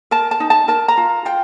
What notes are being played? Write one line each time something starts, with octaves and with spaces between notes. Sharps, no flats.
A#4 A5
A5
D#4
A5
A#4 A5
A#5
F4
F4 G5